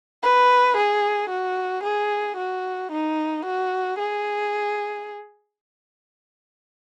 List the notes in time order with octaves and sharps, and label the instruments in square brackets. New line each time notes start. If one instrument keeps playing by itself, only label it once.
[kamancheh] B4
G#4
F#4
G#4
F#4
D#4
F#4
G#4